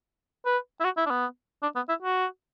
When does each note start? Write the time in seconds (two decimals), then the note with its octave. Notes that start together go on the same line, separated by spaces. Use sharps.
0.46 B4
0.80 E4
0.84 F#4
0.97 E4
1.06 D4
1.10 B3
1.63 D4
1.76 B3
1.89 E4
2.02 F#4